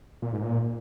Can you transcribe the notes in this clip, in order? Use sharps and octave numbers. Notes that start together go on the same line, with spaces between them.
A#2
G#2
A#2